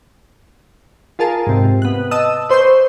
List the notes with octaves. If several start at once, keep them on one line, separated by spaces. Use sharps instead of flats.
F4 G#4 A#4 A5
G#2 C3
B3 F#6
D#5 A5 D#6 E6
B4 C5 C6 C#6 G6